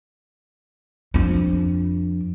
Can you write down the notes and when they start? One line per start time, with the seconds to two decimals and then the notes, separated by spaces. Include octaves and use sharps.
1.14 F2 D4